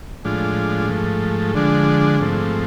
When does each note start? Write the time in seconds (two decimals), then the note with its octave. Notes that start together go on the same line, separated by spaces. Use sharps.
0.25 A2 F3 G#3 D4 F4
0.90 G#2 F3 A3
1.54 D3 F3 G#3 D4
2.20 G#2 F3 A3 C4